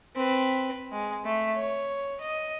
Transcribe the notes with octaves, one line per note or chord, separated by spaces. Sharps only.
C4 B4
G#3
A3
C#5
D#5